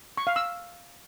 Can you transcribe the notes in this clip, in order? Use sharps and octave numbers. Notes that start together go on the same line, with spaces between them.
C#6
F5
E6